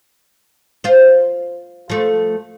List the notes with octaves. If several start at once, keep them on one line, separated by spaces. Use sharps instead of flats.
F4 C5
F3 A3